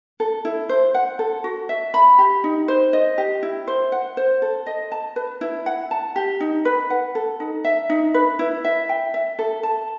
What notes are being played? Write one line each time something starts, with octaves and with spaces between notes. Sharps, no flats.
A4
E4
C5
F#5
A4
F#4
E5
B5
G4
D#4
C5
D#5
G4
E4
C5
F#5
C5
A4
D#5
A5
B4
E4
F#5
A5
G4
D#4
B4
F#5
A4
D#4
E5
D#4
B4
E4
E5
G5
E5
A4
A5